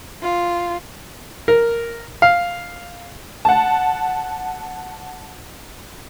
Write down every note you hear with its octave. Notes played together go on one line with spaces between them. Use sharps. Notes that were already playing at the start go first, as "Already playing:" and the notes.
F4
A#4
F5
F#5 A5